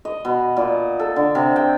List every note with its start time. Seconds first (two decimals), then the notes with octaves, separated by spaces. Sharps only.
0.05 D#5
0.25 B2
0.57 A#2
0.99 A4
1.16 D3
1.35 C3
1.56 G5